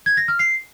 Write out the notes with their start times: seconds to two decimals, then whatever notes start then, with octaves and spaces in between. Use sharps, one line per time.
0.06 G#6
0.17 A#6
0.28 F6
0.39 C7